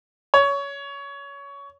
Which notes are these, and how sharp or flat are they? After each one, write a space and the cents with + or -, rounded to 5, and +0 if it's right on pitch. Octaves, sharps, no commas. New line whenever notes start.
C#5 +20